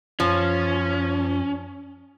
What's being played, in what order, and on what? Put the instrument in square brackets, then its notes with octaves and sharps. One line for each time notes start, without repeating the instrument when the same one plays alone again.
[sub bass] F#2 [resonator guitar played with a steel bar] F3 [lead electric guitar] C#4